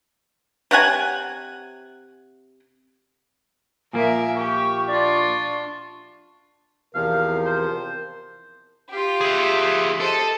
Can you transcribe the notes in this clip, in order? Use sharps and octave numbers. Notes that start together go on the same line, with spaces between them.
C3 C#5 F#5 G#5
A#2 F3 A#3 A#4 E5 G#5
G4 C#6
D4 F4 D5
E2 C3 F3 A#4 F5
C5
F4 G4
G#4 E5
A4 C5 D#5